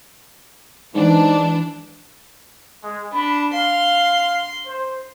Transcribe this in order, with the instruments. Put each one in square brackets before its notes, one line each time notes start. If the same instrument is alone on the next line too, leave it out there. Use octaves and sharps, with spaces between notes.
[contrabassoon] G#2 [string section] E3 D4
[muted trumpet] G#3
[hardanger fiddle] D4 [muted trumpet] B5
[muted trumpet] F5 [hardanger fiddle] C6
[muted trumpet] C5